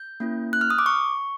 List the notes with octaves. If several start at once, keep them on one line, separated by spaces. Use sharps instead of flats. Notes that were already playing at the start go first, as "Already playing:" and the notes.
Already playing: G6
A#3 C#4 E4
F#6
F6
D#6
D6
C#6